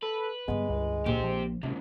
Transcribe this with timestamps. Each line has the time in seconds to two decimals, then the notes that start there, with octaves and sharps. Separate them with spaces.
0.02 A4 B4
0.48 G2 D3 G#3 B3
0.70 C#2
1.06 A#1 A#2 G4 C5
1.24 F3
1.63 D#2 G#2 C3 C#4